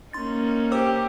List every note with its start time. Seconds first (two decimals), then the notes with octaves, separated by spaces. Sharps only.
0.13 A#3 C#4 D#4 C6 A6
0.72 G4 C5 D6 E6